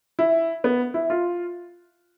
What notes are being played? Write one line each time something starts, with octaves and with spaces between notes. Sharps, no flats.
E4
B3
E4
F4